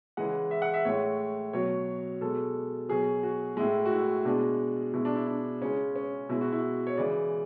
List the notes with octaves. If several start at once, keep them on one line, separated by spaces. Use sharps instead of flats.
C#3 E3 G#3 F#5
E5
F#5
E5
A2 G#3 C#5
B2 F#3 C#5
B2 G#3 A4
B2 F#3 G#4
F#4
A2 G#3 E4
F#4
E4
B2 G#3 D4
B2 G#3 E4
D4
E4
D4
C#3 G#3 C#4
C#4
B2 G#3 E4
F#4
E4
C#5
C#3 E3 G#3 D5